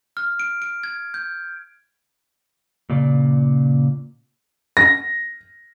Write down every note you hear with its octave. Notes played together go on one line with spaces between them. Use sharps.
F6
D7
D7
G#6
G6
A#2 C#3 D5
A#6